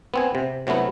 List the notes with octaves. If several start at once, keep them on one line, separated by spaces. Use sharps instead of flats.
B3 C4 G#5
C3
C3 F#3 A3 B3 E4